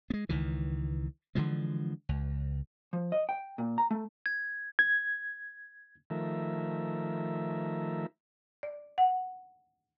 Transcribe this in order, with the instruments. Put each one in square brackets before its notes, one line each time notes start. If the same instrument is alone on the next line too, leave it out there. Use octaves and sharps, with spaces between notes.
[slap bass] G#3 B3
C#2 D#3 E3
D3 E3 F3 G#3
C#2
[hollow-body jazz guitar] F3
D#5
G5
A#2
A#5
A3
[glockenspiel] G#6
[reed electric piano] G#6
[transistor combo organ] D#3 F3 A3 A#4 E5
[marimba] D5
F#5